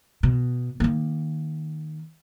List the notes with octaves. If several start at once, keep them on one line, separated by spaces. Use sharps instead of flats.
B2
D#3 A#3